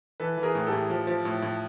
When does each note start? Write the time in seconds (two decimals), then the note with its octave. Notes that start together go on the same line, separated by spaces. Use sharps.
0.20 E3 A4 B4
0.37 E3
0.43 G#4 A#4
0.55 A2
0.67 G4 A4
0.72 A2
0.90 F3
1.07 F3
1.25 A2
1.42 A2